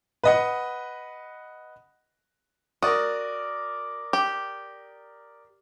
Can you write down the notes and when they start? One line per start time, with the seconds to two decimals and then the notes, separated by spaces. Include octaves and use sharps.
0.24 B4 D#5 F#5
2.83 F#4 A#4 D5 D#6
4.13 G4